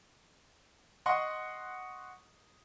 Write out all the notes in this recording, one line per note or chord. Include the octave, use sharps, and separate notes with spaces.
D#5 F#5 C6 C#6